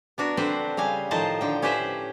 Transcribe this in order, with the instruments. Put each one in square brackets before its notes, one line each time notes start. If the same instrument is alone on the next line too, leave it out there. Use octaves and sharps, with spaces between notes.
[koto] B3 D4 F#4 A#4
D3 C4 D4 B4 C5
C#3 G3 F5 G#5
A2 D#3 F3 C5 D#5 A5
D3 G5
C#4 G4 B4 C5 E5